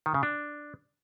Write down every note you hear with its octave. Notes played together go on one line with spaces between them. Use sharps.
D#3
C#3
D4